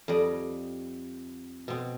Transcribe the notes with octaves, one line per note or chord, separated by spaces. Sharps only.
F2 G3 D5 D#5
B2 C4